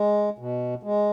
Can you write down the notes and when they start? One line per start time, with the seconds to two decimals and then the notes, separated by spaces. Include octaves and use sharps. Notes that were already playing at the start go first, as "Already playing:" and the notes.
Already playing: G#3
0.39 B2
0.83 G#3